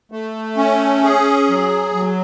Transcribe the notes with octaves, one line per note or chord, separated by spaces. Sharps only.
A3
C#4
G#4
F#3
F#3